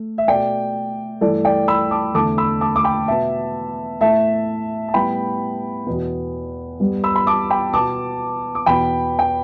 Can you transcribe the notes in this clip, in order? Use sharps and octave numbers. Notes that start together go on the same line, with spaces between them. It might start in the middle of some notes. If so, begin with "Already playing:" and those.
Already playing: A3
E5
B2 A3 D5 G5
G2 E3 A3 A4 D5
D5 G5
B5 E6
A5 D6
E2 D3 A3 A5 D6
B5 E6
A5 D6
D6
G5 B5
B2 B3 E5 A5
A2 A3 E5 A5
A5
A2 G3 B3 G5 B5
E2 B2 B3
G2 G3 B3
B5 E6
B5
A5 D6
G5 B5
B2 B3 A5 D6
D6
E2 B2 B3 G5 B5
G5